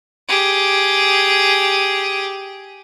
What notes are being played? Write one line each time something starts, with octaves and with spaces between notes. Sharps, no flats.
G4 G#4